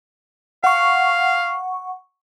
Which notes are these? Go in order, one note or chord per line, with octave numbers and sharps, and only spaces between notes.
F5 F#5 C#6